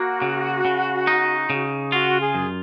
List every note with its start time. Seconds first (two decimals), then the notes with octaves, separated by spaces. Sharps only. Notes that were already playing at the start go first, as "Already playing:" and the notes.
Already playing: A#3 F#4
0.22 C#3
0.65 C#3
1.07 D#4
1.50 C#3
1.92 F4 F#4
2.20 G#4
2.35 F#2